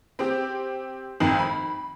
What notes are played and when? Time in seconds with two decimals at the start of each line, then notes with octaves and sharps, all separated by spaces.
0.19 C4 G4
1.20 G#1 F2 D#3 F#7
1.39 B5